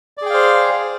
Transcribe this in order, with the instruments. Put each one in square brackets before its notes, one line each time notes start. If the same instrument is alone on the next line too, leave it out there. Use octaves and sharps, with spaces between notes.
[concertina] D5
G#4
G5
F5
C5